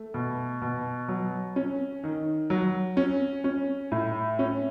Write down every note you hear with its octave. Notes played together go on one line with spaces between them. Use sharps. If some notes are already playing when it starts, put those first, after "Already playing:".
Already playing: A3
B2
B2
F#3
C#4
D#3
F#3
C#4
C#4
A2
C#4